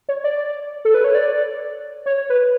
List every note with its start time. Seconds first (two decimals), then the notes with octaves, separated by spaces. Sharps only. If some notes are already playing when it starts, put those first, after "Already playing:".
0.09 C#5
0.24 D5
0.85 A4
0.94 B4
1.04 C#5
1.15 D5
2.06 C#5
2.30 B4